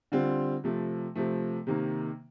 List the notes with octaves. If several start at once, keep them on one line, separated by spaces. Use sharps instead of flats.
D3 G3 C4 F4
C3 F3 A3
C3 F3 A3
C3 D#3 A#3